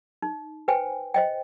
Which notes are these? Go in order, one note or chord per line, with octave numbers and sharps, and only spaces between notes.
D#4
B4 C5 G5 G#5
C5 D#5 G5